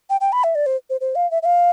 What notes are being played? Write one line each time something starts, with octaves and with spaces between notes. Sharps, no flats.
G5
G5
B5
E5
D5
C5
C5
C5
F5
E5
E5
F5